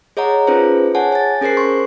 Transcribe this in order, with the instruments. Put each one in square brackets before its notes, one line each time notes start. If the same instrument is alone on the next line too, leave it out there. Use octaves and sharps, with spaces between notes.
[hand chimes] G#4 C#5 D#5 F#5 A#5
C#4 D#4 F4 G#4 B4 C5
G#4 C#5 F#5 G#5 A5
G#5 A6
C#4 G#4 A#4 C5 C7
C6 C#6